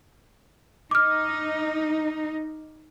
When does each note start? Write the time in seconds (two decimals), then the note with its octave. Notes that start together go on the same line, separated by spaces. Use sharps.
0.91 D#4 D6 F6